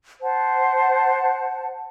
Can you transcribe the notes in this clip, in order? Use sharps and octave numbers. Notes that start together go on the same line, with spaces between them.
C5 F#5 A5